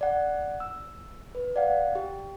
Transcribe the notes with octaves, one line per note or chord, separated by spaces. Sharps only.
D5 F#5
E6
B4
D5 F5 F#5
G4